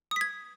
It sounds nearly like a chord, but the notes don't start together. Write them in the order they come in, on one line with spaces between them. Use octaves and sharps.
D#6 B6 G#6